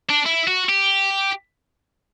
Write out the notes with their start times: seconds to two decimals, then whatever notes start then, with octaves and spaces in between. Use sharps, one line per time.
0.09 D4
0.25 E4
0.47 F#4
0.69 G4